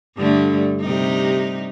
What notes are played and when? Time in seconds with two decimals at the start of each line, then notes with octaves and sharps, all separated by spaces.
0.15 G2 D3 A3
0.81 C3 G3 D#4